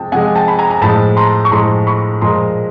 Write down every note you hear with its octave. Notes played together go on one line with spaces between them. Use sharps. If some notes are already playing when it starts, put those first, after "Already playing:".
Already playing: C3 F3 G#3 G5 A5
C3 F3 G#3 F#5 G#5
G5 A5
B5
G#5 A#5
A#5
A2 F3 G#3 A5 B5
A#5 C6
C#6
A2 F3 G#3 A#5 C6
B5 C#6
A#2 F3 G#3 A#5 C6